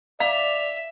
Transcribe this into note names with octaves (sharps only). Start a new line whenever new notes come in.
D5 E5 F5 F7